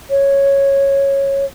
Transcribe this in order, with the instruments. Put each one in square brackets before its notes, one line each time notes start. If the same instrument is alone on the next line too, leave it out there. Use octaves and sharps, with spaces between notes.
[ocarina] C#5